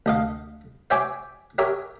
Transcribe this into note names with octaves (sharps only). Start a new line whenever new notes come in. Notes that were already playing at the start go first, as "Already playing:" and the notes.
D2 D#5 F5
C5 C#5 E5 G5 G#5 D6
G4 A#4 C#5 E5